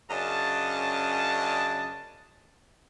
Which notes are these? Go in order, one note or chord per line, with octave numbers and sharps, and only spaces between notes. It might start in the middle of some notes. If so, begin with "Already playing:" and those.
F#2 C#3 D4 D#5 A5